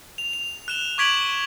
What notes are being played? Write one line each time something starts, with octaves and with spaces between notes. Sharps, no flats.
F7
F7
F#6 E7 G7
C#6 D6 G#6 B6 D7 F#7